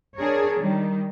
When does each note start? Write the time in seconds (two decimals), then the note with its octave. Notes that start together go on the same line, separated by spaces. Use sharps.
0.17 D4 G#4 A#4 C#5
0.61 D#3 G3